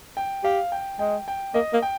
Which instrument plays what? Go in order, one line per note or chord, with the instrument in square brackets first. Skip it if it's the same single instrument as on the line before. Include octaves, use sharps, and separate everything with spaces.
[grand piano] G5
[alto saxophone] G4 [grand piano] F5
[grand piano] G5
[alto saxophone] G#3 [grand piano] G5
[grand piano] G5
[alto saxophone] A#3 [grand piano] D#5
[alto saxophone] A#3
[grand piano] G5